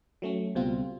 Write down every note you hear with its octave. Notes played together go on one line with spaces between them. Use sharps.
F#3 A3 C#4
C#2 B2 G3 C4 F4